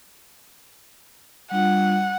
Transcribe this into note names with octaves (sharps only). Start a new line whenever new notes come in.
G3 D4 F4 F#5